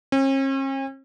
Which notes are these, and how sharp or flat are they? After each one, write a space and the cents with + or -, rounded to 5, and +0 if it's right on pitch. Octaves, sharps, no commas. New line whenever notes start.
C#4 -45